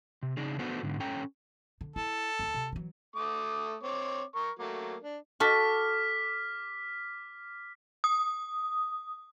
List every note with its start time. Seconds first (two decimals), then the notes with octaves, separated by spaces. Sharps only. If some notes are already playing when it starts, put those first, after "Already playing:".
0.23 C3
0.37 C#3 D4 D#4 G#4
0.59 B3 D4 F#4 A4 B4 C5
0.83 G#2 D3
1.00 C#4 A4 C#5 G5 A#5
1.81 D3
1.96 E4 A4
2.39 D#1 D#2
2.54 C3
2.72 E3 F#3
3.16 A3 D6 D#6
3.83 C4 C#5 D6
4.36 A#4 C#6
4.59 F#3 A3 A#3
5.03 D4
5.40 F#4 A4 D6 F6 B6
8.04 D#6